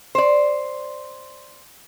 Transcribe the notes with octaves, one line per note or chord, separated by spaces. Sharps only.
C5 D5